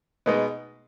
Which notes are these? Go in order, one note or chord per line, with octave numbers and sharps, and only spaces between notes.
B2 G#3 B3 D#4